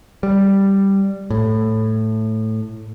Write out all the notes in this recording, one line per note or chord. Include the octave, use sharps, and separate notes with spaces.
G3
A2